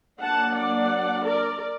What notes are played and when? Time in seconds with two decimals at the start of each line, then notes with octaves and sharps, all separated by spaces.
0.22 F#3 A#3 D4 F#5 A5
0.57 D5 F#5
1.26 A#4 D5